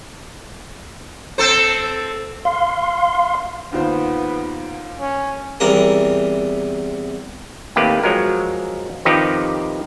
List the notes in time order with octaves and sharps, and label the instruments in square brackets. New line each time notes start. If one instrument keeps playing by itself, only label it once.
[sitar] C4 A4 C5
[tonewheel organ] F5 C6
[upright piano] D#2 F4 C5 [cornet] B3
[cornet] C#4
[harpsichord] E2 C3 G3 A#4
[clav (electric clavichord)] D#2 C3 A3 A#3 G4 B4
F3 F#3 G#3 A#4
C3 D#3 F3 D#4 G4 B4